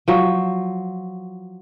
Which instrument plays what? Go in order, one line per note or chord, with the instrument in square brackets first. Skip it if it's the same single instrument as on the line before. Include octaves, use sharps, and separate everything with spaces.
[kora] F3 F#3